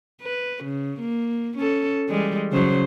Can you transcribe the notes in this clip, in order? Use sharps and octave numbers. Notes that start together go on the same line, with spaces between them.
B4
C#3
A#3
C#4 A4
E3 G3 G#3
C#3 F#3 C5